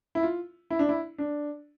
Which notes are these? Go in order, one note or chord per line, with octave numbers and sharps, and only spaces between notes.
E4
F4
E4
D4
E4
D4